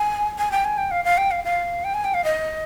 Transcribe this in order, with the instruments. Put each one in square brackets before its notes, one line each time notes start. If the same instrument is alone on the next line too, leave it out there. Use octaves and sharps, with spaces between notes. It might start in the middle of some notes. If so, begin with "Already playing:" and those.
Already playing: [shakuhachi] G#5
G#5
G5
G#5
G5
F5
F5
G5
F5
F5
G5
G#5
G5
F5
D#5